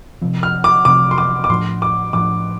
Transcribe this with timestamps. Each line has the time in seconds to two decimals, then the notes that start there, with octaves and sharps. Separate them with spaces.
0.21 C3 F3 C4
0.43 F6
0.64 D6
0.85 C3 F3 C4 D6
1.11 C6
1.18 D6
1.44 D6
1.49 A2 F3 D4 C6
1.82 D6
2.13 A2 F3 D4 D6